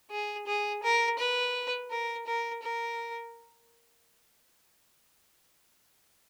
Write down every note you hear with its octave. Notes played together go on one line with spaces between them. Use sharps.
G#4
G#4
A#4
B4
A#4
A#4
A#4